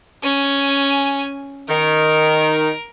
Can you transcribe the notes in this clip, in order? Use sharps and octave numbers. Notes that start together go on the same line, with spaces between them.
C#4 G#5
D#3 A#4